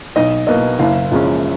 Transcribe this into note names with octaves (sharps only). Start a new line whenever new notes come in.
B1 D#5
B2 A#3 D#5
F#1 F5
F#2 F3 G#3 C#4